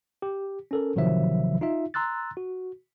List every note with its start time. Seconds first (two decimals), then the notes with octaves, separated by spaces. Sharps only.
0.22 G4
0.71 C#4 A4 A#4
0.96 A1 C3 D#3 F3 F#3 E5
1.61 D#4 F4 E5
1.94 A#5 C6 E6 F#6 A6
2.37 F#4